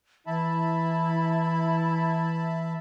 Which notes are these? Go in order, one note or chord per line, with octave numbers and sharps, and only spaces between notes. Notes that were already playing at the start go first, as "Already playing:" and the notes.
E3 E4 E5 A5 B5